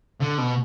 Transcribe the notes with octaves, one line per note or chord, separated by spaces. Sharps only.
D3
B2